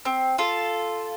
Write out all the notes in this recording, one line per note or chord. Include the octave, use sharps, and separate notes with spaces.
C4
F4 A4